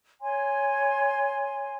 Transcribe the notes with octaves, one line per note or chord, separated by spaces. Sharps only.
C#5 G#5 C6